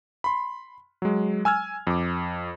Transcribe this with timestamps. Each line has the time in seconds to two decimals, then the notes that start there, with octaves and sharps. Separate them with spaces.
0.24 B5 C6
1.02 F#3 G#3
1.45 G#5 E6 F6 G#6
1.87 F2 D6